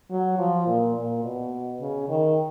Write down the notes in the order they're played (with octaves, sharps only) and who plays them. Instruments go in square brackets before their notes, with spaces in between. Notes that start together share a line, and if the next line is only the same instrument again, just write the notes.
[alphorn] F#3
F3
A#2
A#2
B2
C#3
D#3